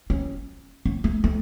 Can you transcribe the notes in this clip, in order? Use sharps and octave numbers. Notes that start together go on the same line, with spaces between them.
C#4
C#4
A3
A3